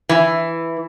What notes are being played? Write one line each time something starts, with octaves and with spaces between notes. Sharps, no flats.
E3